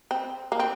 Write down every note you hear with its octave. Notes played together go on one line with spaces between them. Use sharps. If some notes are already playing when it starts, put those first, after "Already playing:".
C4
A#3
C4